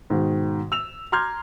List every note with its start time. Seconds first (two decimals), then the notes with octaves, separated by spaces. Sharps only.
0.10 G#2 B2 D#3
0.72 E6 F7
1.12 A#5 C6 D6 F6 G6 G#6